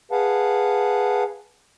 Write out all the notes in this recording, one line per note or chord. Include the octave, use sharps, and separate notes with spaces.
G#4 B4 F5 F#5 A5